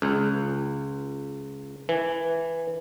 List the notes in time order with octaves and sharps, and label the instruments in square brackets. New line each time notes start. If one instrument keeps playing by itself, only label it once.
[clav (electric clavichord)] C#2
E3